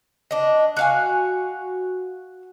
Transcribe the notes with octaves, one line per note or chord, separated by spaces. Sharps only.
D4 D#5
F#4 F5 G#5